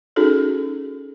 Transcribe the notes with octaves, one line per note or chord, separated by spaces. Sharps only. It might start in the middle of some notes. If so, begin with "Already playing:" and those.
C#4 D#4 F#4 G#4 A4